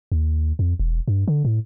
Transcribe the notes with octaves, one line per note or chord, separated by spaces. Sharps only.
D#2
F2
E1
G2
D3
A2